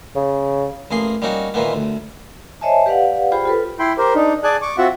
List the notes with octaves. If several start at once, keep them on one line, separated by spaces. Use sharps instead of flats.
C#3
A1 A#3 G#4 C6
G3 A#3 C#4 D#4 F#4
A#2 D#3 E3 A#3 B3
D2
C5 C#5 D#5 E5 G#5 A5
G4 B4 D5 F5 F#5
F4 G4 G#4 C5 G5 B5
F4 A4 B4
E4 G5 B5 C6
G4 A#4 C5
D4 D#4
G#4 D5 G#5 A5 F#6
C#6 D6
C4 F4 F#4 E5 F#5